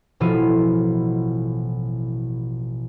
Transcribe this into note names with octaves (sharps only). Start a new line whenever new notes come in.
A1 B2 F3 E4 F4 D#7